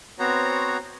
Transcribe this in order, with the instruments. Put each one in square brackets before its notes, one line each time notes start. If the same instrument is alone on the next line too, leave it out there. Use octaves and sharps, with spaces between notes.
[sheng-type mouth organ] B3 C4 F#4 C5 C#5 A#5